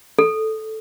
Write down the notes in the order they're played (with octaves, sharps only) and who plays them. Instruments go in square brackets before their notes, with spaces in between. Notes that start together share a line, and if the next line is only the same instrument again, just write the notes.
[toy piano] A4